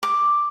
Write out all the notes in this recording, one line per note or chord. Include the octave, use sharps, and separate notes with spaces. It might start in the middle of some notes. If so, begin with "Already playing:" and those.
D6